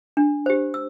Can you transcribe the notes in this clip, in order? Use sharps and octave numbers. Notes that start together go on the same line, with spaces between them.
D4
G4 C5
E6